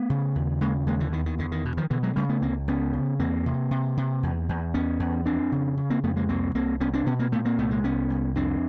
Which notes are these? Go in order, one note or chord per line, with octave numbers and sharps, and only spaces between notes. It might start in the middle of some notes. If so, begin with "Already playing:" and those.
Already playing: A3 B3
C#3
D#2
C#3 G#3 A#3
D#2 G#3 A#3
D3 E3
E2 D#3
D#3
E2 D3
D#3
B2
D#3 F3
B2 D3 E3
F#3 G#3
C#3 G3 A3
A3 B3
C#2 A#3 C4
C#2 B3 C#4
C#3
E2 A#3 C4
C3
C3
C3
E2
E2
E2 B3 C#4
E2
F2 C4 D4
C#3
C#3
A#3 C4
F2 A3 B3
G#3 A#3
C2 A#3 C4
C2 A#3 C4
C2 B3 C#4
C4 D4
B2 B3 C#4
A#3 C4
A#2 A3 B3
A#3 C4
C2 A3 B3
G#3 A#3
C2 B3 C#4
C2
F2 C4 D4